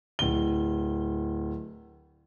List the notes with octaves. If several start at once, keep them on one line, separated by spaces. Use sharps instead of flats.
D1 G7